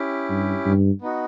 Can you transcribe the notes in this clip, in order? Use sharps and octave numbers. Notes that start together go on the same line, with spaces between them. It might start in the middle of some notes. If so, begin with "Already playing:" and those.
Already playing: C#4 E4 G4
G2
G2
B3 D#4 F#4